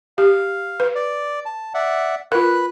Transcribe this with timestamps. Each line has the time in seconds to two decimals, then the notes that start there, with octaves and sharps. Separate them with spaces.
0.18 G4 F5
0.80 B4
0.95 D5
1.46 A5
1.74 D5 E5 F#5
2.32 F4 A#4 B4 F#6